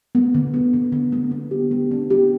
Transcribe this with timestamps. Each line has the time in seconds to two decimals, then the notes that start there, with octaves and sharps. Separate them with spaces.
0.15 B3
0.35 D3
0.54 B3
0.73 D3
0.92 D3
1.12 B3
1.31 B3
1.51 G4
1.71 B3
1.91 D4
2.10 G4